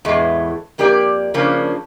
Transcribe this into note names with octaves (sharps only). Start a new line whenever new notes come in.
E2 A2 E3 G#3
F2 A#3 G4 A#4 D5
C#3 F3 A#3 C#4 D4